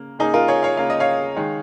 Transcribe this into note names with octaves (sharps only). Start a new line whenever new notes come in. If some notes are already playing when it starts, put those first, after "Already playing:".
Already playing: C#3 A#3
C#3 A#3 D#4 G#4
F4 A#4
G#4 C#5
C#5 F5
C#3 A#3 F5
D#5
C#5 F5
D#3 G#3